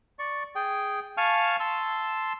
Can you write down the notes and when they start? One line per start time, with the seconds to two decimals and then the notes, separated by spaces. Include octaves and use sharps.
0.19 D5 C#6
0.55 G#4 G5
1.17 F5 G#5 A5 C#6 F6
1.60 A5 C6 E6